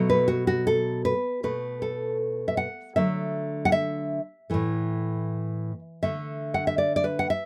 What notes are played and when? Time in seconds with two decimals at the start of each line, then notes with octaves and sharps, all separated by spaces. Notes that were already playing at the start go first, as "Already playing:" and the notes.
Already playing: B2 F#3 A3
0.10 B4
0.28 F#4
0.47 F#4
0.67 A4
1.05 B4
1.43 B2 A3 B4
1.82 A4
2.48 E5
2.57 F#5
2.96 D3 F#3 A3 E5
3.65 F#5
3.72 E5
4.50 A2 E3 A3
6.03 D3 A3 E5
6.54 F#5
6.67 E5
6.78 D5
6.96 D5
7.04 B4
7.19 F#5
7.30 E5